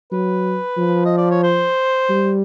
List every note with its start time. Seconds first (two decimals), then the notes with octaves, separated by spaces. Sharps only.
0.12 F#3 B4
0.78 F3
1.05 D#5
1.18 D5
1.31 C#5
1.43 C5
2.10 G3